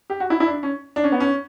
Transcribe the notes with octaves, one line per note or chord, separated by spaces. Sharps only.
G4
F#4
E4
E4
D4
C#4
D4
C#4
B3
C#4